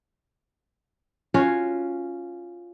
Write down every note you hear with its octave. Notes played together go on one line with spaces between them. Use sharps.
C#4 F4 F#4 C#5